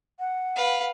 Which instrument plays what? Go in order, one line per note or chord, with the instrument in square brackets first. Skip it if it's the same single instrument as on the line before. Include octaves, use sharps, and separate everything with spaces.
[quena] F#5
[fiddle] B4 F5